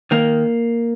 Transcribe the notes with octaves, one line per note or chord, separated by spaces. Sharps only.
D#3 A#3